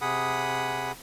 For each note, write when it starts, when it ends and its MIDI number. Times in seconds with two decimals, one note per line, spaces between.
0.02 0.92 48
0.02 0.92 68
0.02 0.92 78
0.02 0.92 83
0.02 0.92 87